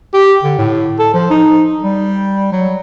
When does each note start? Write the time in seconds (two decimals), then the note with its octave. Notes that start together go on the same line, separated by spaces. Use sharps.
0.14 G4
0.44 D3
0.59 A2
0.99 A4
1.14 F3
1.30 D#4
1.83 G3
2.52 F#3